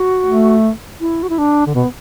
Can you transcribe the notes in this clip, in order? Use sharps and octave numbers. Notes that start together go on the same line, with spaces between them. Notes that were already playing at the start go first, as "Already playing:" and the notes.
Already playing: F#4
A3
E4
F#4
E4
D4
D3
B2 B3